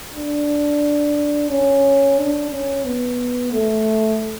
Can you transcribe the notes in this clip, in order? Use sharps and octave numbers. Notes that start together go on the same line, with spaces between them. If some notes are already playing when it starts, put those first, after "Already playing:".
D4
C#4
D4
C#4
B3
A3